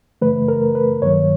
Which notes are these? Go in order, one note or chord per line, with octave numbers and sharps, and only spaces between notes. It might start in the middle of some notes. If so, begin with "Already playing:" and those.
F#2 C#3 E3 A3 B4
A#4
B4
G2 D#3 F#3 A#3 C#5